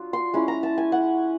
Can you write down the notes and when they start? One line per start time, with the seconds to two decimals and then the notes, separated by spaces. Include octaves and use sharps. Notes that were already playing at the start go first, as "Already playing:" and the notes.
Already playing: F#3 D4 F4
0.13 C6
0.34 G#3 C#4 E4
0.48 A#5
0.63 A5
0.78 G#5
0.92 F#5